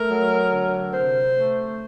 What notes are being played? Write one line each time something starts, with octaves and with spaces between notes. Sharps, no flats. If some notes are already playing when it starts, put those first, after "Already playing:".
Already playing: A3 A#4
F#3
D3
C3 C5
A3